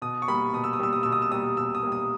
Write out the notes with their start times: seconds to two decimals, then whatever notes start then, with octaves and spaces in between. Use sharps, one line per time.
0.02 B2 D#6
0.22 C#6
0.28 G3 A#3 B5
0.53 B2 D#6
0.64 E6
0.73 D#6
0.80 G3 A#3 E6
0.93 D#6
1.03 B2 E6
1.12 D#6
1.22 E6
1.31 G3 A#3 D#6
1.57 B2 E6
1.75 D#6
1.83 G3 A#3
1.92 D#6